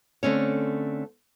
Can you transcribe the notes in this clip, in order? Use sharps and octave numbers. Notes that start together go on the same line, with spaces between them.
D3 A3 C4 C#4 C#5